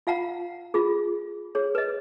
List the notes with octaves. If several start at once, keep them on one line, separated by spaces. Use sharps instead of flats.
F4 F5 F#5 A#5
F4 G#4
G#4 C#5
B4 D#5